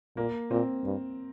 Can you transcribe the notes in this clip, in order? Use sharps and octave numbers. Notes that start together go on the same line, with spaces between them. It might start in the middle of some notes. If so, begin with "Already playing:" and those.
A#2 A#3
A#2 C4
G2